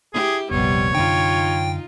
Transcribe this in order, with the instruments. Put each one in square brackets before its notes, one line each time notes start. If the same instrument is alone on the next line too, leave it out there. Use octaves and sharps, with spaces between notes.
[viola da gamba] E4 G4 [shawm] G#4
[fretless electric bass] F1 A#1 [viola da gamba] C3 G3 B3 [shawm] C#5
[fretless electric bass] F#2 D3 D4 [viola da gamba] D#4 F4 [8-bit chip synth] G5